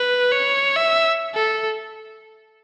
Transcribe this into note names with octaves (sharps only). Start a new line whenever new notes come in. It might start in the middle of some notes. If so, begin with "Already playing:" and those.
Already playing: B4
C#5
E5
A4